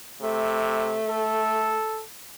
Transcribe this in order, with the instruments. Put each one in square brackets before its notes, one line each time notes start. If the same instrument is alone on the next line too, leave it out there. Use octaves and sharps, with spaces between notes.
[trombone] C3 [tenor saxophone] A3
[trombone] A4